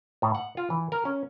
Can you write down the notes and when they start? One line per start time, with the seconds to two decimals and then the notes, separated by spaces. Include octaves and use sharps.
0.22 A2
0.35 F#5
0.57 F4
0.70 E3
0.92 A#4
1.05 C#4